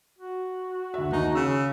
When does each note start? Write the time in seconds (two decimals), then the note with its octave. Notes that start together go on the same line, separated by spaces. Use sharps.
0.19 F#4
0.94 D2 E5
1.12 D#2 D#4
1.35 C#3 E6